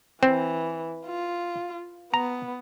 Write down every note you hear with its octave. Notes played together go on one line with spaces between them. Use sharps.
E3 C4
F4
B3 A#5